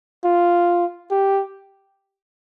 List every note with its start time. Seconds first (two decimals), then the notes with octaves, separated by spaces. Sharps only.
0.25 F4
1.11 G4